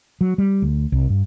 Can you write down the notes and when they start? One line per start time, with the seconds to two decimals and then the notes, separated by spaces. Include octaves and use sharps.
0.21 F#3
0.38 G3
0.62 D2
0.92 C2
1.10 G2